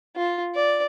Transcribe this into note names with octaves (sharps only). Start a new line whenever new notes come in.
F4
D5